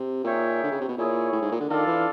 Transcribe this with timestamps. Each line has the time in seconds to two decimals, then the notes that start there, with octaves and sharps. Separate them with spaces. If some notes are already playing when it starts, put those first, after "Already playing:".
Already playing: C3
0.24 A#2 D#4 G#4 C#5 E5 G5
0.63 D3
0.72 C#3
0.81 C3
0.88 B2
0.97 A#2 E4 G#4 C#5
1.33 A2
1.42 G#2
1.51 A#2
1.60 D3
1.69 D#3 D4 F4 A4 D5 F5
1.87 E3